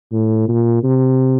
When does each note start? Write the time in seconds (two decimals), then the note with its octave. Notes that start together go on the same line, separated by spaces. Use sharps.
0.12 A2
0.48 A#2
0.83 C3